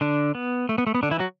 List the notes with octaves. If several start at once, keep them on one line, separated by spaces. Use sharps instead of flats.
D3 D4
B3
A3
B3
A3
B3
D3 D4
E3 E4
F#3 F#4